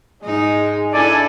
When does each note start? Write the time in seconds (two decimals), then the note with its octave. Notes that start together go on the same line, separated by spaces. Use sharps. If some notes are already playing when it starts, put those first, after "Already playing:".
0.25 G#2 G#3 D#4
0.93 D4 E4 A4 D5 G#5